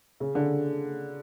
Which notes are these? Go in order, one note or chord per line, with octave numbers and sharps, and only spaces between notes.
C#3
D3